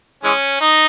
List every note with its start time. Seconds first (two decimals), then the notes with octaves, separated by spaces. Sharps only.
0.24 E3 G#3 C#4
0.61 D#4